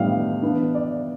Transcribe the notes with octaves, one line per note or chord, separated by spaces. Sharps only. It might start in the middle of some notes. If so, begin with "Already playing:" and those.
Already playing: A2 G3 B3 D4 F5
E3 B3 D4
D5